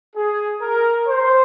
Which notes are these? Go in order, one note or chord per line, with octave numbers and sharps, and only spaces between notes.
G#4
A#4
C5